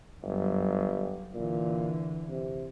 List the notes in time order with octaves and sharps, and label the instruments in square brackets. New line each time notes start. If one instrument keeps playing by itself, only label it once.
[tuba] G1 [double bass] F#2 G3
[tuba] A#2 [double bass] D3 E3
[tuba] C3